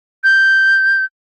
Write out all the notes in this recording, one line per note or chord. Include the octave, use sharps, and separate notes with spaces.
G6